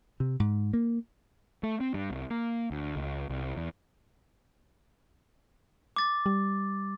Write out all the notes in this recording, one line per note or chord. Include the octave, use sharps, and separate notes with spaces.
C3
G#2
A#3
A3
C4
G2
C2
A#3
D2
C#2
C2
E2
D6 A6
G3